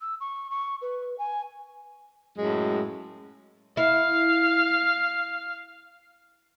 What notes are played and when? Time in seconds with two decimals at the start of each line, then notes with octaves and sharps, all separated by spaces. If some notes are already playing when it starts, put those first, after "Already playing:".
0.01 E6
0.21 C#6
0.51 C#6
0.82 B4
1.18 G#5
2.37 F#2 A2 G#3
3.77 E4 F5